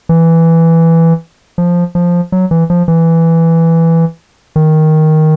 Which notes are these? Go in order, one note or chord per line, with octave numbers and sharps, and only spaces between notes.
E3
F3
F3
F#3
E3
F3
E3
D#3